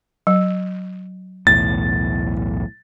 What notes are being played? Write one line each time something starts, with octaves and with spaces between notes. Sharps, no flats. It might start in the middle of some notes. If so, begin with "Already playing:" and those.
F#3
B1 E2 A2 A6